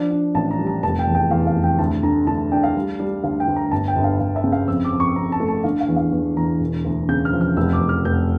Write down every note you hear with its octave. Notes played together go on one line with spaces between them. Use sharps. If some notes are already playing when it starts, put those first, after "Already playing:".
Already playing: F3 D4
D4
A1 A5
A#5
G3
A#5
F1 A5
G5
E2
G5
E2 F5
F5
F1
G5
D2 A5
D3 A#5
D3 A5
D4 G5
F5
G3
G3
D2 F5
G5
D2
A#5
G1 A5
G5
G1
F5
G1 F5
E5
C#3
F5
F2 E6
D6
F2
C#6
F2 A#5
A5
A3
A5
D3 F5
F5
E2
F5
E2
E2 A#5
E1
D2
C#3 G6
F6
F3
F6
F1 E6
D6
F1
F6
F1 G6